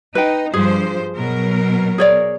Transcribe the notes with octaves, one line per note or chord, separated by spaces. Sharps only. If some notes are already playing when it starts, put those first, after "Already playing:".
D#4 B4 G5
G2 F3 G#4 C5
B2 F#3 A#4
G#4 C#5 D5